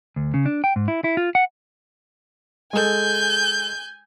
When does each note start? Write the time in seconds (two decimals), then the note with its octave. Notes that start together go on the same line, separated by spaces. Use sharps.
0.16 D2
0.34 C#3
0.46 D4
0.64 G5
0.76 G#2
0.88 E4
1.04 E4
1.17 F4
1.35 F#5
2.73 G#3 A4 G#5 G6